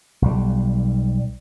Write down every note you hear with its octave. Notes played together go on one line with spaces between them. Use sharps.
B1 G3